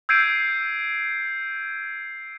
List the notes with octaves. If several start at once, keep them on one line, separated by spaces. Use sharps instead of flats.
E6 G6 G#6 C7 D7 D#7